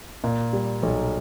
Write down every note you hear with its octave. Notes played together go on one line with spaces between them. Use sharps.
A#2
G3
B1